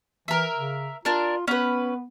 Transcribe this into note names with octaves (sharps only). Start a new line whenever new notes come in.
E3 A#4 E5
C#3
D4 F4 A#4
B3 C#4 B4